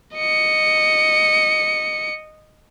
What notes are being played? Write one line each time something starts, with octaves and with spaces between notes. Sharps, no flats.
D#5 C#7